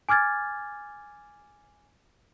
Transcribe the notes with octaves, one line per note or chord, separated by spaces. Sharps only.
G#5 D6 F6 G#6 A6